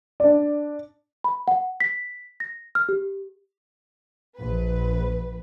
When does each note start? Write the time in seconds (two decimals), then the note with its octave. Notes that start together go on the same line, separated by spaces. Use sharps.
0.20 D4 D5
1.24 B5
1.48 F#5
1.80 B6
2.40 A#6
2.75 F6
2.89 G4
4.36 A#1 B4